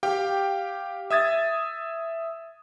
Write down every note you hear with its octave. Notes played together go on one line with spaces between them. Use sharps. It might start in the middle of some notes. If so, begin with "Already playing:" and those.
G4 F5 G5
E5 D#6 G#6 A6